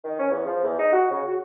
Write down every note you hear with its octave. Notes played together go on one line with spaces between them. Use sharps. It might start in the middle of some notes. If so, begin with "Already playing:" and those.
D#3
C#4
E2
F3
E2
D#4
F#4
C#3
F#4